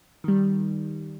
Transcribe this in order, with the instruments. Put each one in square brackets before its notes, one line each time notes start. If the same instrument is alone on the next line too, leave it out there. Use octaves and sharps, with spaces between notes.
[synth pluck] D#3 G3